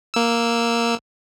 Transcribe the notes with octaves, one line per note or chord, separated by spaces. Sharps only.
A#3 E6